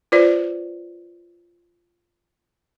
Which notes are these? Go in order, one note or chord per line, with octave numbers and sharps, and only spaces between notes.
F4 B4 C5 D5